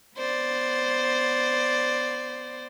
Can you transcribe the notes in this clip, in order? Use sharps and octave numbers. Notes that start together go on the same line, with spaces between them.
B3 C5 D5